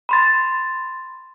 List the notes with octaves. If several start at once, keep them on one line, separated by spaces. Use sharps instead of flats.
B5 C6 A6